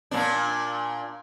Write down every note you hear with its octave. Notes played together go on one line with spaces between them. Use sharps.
A#2 D4